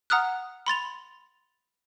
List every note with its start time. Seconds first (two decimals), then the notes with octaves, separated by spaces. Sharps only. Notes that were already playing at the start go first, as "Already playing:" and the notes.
0.10 F#5 A#5 D#6 F6 F#6
0.66 B5 C6 A6 F7